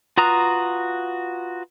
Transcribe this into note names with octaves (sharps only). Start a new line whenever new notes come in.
F4 F#4 B4 A#5 D#6